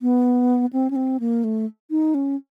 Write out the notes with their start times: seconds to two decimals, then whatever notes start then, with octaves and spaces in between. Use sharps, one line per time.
0.02 B3
0.73 C4
0.90 C#4
0.96 C4
1.20 A#3
1.44 A3
1.91 D#4
2.14 C#4